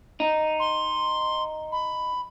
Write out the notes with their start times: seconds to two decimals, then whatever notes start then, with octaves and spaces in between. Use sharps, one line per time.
0.20 D#4
0.60 C6
1.72 B5